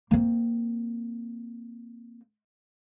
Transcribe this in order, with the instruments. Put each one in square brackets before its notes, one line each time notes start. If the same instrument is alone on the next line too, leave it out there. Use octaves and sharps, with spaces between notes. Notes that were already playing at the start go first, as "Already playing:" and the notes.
[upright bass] A#3 C4